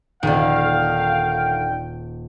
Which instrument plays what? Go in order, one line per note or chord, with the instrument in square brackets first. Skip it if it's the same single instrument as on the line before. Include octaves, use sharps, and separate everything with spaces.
[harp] D#1 [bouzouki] D3 D#3 [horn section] F5 [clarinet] G5